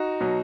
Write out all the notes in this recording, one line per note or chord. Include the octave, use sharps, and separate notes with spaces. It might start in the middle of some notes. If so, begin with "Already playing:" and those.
Already playing: D#4 F#4
B2 F#3